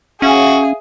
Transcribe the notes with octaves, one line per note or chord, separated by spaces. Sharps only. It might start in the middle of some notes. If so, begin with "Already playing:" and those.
C#4 F#4 G#4 E5 F5